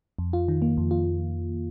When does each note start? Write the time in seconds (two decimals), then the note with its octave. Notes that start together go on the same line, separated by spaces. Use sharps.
0.19 F2
0.33 F4
0.48 D#3
0.62 A#3
0.77 F2
0.91 F4